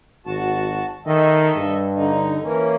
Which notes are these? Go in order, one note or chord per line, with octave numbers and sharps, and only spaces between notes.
G#1 F#4 A5
D#3 A4 D#5 E5
G2
D3 D#4
E3 A#3 C#4